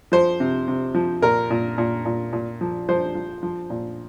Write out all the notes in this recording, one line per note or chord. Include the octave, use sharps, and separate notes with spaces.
F3 C5
C3
C3
F3
A#2 A#4
A#2
A#2
A#2
A#2
F3
F3 C5
F3
F3
A#2